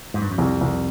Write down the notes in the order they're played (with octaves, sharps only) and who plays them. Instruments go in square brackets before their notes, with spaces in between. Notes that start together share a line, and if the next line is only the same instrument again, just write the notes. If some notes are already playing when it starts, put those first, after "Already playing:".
[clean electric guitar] G#2
G2
F#2
[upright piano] C2 [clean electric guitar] F2
[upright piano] C2